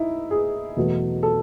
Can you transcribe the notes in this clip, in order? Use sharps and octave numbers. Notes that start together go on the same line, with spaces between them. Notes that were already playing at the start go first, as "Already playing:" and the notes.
Already playing: D#4 E4
G#4
E2 B2 F#3 A3
A4